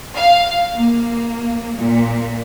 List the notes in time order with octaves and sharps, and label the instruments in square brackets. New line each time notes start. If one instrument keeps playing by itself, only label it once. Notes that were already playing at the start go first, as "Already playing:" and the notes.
[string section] F5
A#3
A#2